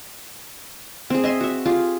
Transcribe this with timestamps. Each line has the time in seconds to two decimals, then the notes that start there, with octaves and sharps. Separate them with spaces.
1.10 C4 G#4
1.24 D#5 E5 C6
1.41 F#4 E5
1.65 F4 G4 G#4